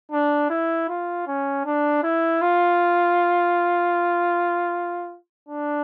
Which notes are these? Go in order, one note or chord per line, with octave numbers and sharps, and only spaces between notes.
D4
E4
F4
C#4
D4
E4
F4
D4